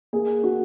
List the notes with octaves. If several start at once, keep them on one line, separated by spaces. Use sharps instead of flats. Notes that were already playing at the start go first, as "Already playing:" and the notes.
A#3 G#4
F#4